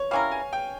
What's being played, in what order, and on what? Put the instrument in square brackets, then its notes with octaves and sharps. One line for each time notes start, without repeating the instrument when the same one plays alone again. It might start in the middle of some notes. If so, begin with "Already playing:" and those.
Already playing: [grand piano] C#5
[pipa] G3 C#4 E4 A#4 [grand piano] F5
[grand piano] G#5
G5